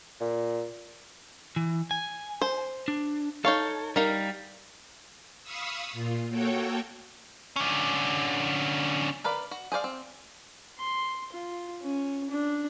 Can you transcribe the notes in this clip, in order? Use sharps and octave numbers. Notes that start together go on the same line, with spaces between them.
A#2
E3
G#5
C5
D4
D#4 A4 C#5 F5
G3 D#4 A#4 F5
F5 B5 C#6 D#6 E6
A#2 F4
A#3 F#4 A4 C#5 G5
D3 C#4
A#4 B4 D5 F5
F#4
G#4 C5 D5 F5
C4
C6
F4
C#4
D4